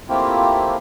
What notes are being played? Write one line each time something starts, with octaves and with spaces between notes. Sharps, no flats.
A3 A#3 C4 E4 F4 G4